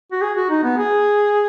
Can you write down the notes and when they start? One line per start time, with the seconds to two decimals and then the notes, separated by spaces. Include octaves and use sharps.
0.12 F#4
0.22 G#4
0.36 F#4
0.50 D#4
0.63 B3
0.77 G#4